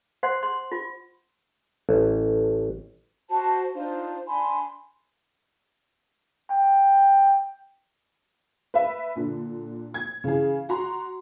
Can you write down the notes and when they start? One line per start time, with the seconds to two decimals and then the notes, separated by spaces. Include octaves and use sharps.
0.23 C5 F#5 C6
0.43 C6
0.72 F4
1.89 A1
3.29 F#4 C5 A5
3.73 D4 D#4 F4 C5
4.27 D4 G#5 B5 C6
6.51 G5
8.74 B4 E5
9.16 A#2 D3
9.94 G#6
10.24 C#3 E3 G#4
10.69 F#4 A#5 C6